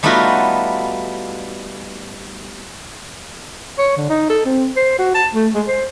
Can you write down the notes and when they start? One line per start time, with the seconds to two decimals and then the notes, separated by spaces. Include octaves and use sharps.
0.03 G3 A3 B3 D#4 F4 F#4
3.78 C#5
3.97 D3
4.10 D#4
4.30 A4
4.45 C4
4.76 C5
4.99 F#4
5.15 A5
5.34 A3
5.54 G#3
5.68 C5